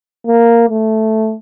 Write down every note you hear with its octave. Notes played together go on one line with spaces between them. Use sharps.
A#3
A3